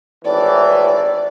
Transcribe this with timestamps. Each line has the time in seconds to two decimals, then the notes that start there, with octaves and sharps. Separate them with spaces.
0.25 G#1 A2 E3 D5